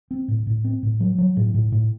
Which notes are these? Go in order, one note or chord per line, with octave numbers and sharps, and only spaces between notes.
C4
A2
A2
C4
A2
F#3
F#3
A2
A2
A2